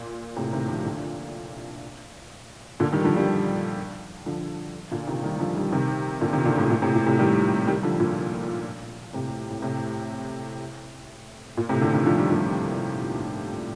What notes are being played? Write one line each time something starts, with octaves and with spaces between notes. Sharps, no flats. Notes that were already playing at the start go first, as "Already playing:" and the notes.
Already playing: A#2
A2 C3
C3 D#3
D3 F3
A#2 D3
A#2 D3
D#3 G3
D3 F3
D#3 G3
D3 F3
A#2 D3
C3 D#3
D#3 G3
D#3
D3 F3
D#3 G3
C3 D#3
A#2 D3
C3 D#3
A#2 D3
A2 C3
A#2
A2 C3
A#2
A2 C3
D#3 G3
D#3 G3
D3 F3
A#2
A2 C3
A2
A2 C3
A#2
A2 C3
A#2 D3
C3 D#3
D3 F3
D#3 G3
A#2 D3